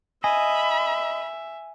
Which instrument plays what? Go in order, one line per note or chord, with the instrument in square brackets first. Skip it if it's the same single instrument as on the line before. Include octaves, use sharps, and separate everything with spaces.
[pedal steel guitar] D#5 [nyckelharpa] E5 [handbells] G#5 [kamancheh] B5